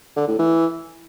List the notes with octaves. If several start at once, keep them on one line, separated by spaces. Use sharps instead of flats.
D3
A2
E3